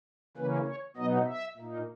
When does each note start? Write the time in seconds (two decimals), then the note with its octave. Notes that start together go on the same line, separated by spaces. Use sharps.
0.37 C#3 E3 A#3 C#4 B4
0.67 C#5
0.97 B2 F#3 B3 D#4 D#5
1.27 E5
1.57 A#2 A#3 D#4